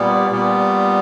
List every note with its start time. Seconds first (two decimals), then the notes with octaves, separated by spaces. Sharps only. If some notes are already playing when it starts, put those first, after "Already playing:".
Already playing: A#2 G3 B3
0.30 A#2 G3 B3